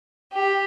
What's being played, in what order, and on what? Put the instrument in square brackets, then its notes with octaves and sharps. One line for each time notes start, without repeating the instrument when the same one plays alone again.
[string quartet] G4